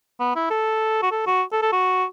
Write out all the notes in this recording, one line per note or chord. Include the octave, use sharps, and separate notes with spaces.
B3
E4
A4
F#4
A4
F#4
A4
A4
F#4